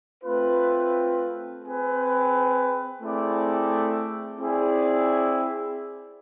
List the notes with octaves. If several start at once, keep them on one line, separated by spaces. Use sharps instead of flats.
A3 C4 F4 B4
C4 G#4 B4
A3 C4 E4 G#4 D5
C4 E4 G#4 D5